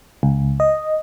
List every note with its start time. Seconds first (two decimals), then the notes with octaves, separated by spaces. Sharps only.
0.23 C#2
0.60 D#5